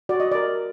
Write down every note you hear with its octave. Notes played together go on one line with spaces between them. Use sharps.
F#4 D5
D#5
A#4 D5